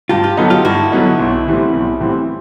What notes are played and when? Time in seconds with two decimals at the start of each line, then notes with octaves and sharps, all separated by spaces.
0.09 G2 F4 G4
0.23 F4 G4
0.37 D3 F#3 B3 D#4
0.50 F4 G4
0.65 G2 E4 F#4
0.92 D3 F#3 B3 D#4
1.19 B1
1.46 A2 E3 G3 C4
1.73 B1
2.00 A2 E3 G3 C4